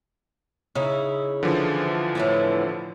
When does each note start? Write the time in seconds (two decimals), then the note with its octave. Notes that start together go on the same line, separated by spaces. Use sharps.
0.75 C#3 D#4 E4
1.43 D3 E3 F3
2.15 A2 B3 E4